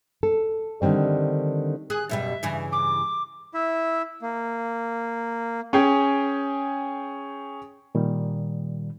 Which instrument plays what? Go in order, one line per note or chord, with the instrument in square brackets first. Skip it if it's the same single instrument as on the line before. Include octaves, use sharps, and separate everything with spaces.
[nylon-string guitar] A4
D3 D#3 G3 C4
[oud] G#4 [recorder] F#6
[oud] F#2 B2 G3 [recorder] E5
[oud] G2 C#3 E3
[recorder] D6
[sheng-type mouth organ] E4 E5
A#3
[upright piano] C#4 G#4 G5
[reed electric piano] A#2 D#3 G3